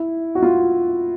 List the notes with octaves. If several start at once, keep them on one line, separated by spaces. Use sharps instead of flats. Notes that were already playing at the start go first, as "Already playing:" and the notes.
Already playing: E4
F#4
F4